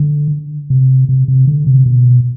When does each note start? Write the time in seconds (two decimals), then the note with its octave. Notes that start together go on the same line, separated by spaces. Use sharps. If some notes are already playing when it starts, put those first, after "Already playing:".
Already playing: D3
0.70 C3
1.09 C3
1.28 C3
1.47 D3
1.66 C3
1.86 B2